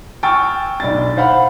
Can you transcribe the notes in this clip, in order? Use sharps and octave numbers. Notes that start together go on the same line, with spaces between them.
G5 G#5 C#6 E6 F6 A6
B1 D4 A6
C5 F5 F#5 B5